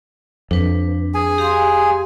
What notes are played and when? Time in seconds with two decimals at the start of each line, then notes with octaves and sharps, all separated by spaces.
0.51 F2 D4 B4
1.14 G#4 G#5
1.38 G4 F5 C6